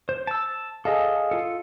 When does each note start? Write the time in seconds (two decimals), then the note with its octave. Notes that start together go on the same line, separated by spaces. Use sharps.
0.09 C5
0.27 A5 E6
0.85 G#4 A4 D#5 F5
1.31 F4 A4